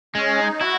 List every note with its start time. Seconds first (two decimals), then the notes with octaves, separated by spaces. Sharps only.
0.15 G#3 C#4
0.38 D#4
0.61 E4 F#4